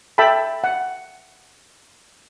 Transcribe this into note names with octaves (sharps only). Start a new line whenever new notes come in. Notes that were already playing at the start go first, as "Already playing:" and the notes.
A4 E5 G5 A5 B5
F#5